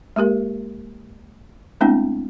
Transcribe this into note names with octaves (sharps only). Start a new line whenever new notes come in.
G#3 A#3 G4 A#4
G#3 A3 B3 C4 D4 E4